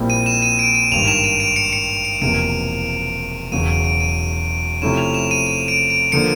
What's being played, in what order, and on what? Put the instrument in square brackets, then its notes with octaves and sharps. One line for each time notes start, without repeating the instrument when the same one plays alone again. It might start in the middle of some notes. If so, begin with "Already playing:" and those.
Already playing: [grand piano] A#1 A#2 G3 C4 E4
[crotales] D#7
E7
D#7
D7
D#7
[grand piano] G#1 G2 D#3 [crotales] F7
[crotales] E7
D#7
D7
C#7
C#7
C#7
[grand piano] E1 E2 C3 F3 A#3 [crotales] D7
[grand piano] E1 E2 C#3 F#3 [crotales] D#7
[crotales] D7
D7
D#7
[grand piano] C3 F3 A3 C#4 E4 [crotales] E7
[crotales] F7
E7
D#7
D#7
D7
D7
[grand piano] D3 F3 A#3 D4 [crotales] C#7